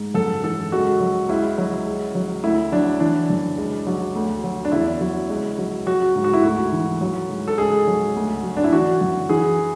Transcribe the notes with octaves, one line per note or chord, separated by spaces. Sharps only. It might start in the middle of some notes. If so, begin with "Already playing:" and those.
Already playing: G#2
F#2 A4
E3 A4
C#2 F#4
F#3
C#2 E4
F#3
C#2
F#3
D2 E4
F#3 D4
E3 D4
F#2
C#2
F#3
D2
F#3
D4
E2 E4
F#3
C#2
F#3
F#3 F#4
G#2
F#4
E4
D2 F#4
E3
F#3
G#2
A4
C#2 G#4
F#3
D2
F#3
D4
E4
E3 F#4
F#2
E3 G#4